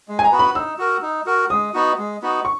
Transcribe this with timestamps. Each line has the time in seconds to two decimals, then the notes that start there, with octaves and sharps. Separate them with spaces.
0.08 G#3
0.19 G#5
0.24 A#5
0.32 B3 F#4 B4
0.39 B5
0.55 D#4 E6
0.78 F#4 A#4
1.02 D#4
1.26 F#4 A#4
1.50 G#3 D#6
1.74 B3 D#4 F#4
1.98 G#3
2.22 B3 D#4 F#4
2.45 C#6